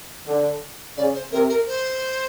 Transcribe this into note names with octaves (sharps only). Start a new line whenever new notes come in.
D3
C#3 D5
C5
C3 A#4
A#4
C5